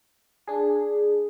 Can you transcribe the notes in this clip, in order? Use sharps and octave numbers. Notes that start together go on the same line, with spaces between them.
D4 G#4